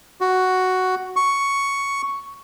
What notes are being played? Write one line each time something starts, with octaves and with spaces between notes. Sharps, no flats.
F#4
C#6